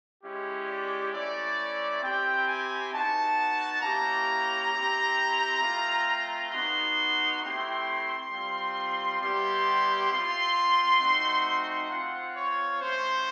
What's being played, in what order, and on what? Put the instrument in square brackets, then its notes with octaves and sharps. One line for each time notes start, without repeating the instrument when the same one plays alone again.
[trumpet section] G#3 C#4 E4 G4
D5
A3 C#4 E4 D5
C4 E4 G4 G5
G#5
B3 D#4 F#4 A5
A#3 C#4 E4 G4 A#5
C4 E4 G4
A3 C4 F4
B3 D#4 F#4 C6
A3 C4 E4 G4 C6
G3 C4 F4
G3 B3 E4 G4 C6
C4 F4 C6
A3 C4 D#4 F#4
C4 F4 F#5
C#5
A3 C#4 F#4 C5